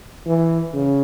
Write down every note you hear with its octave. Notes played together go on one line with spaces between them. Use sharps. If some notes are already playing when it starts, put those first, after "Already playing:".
E3
C#3